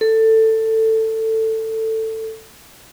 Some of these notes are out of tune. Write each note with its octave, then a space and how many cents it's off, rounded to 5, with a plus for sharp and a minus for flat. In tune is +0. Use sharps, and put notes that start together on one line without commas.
A4 +15